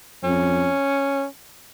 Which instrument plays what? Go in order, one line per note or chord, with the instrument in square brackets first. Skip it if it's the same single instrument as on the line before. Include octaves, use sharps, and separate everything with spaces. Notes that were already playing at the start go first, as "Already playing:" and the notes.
[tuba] F2 [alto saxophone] C#4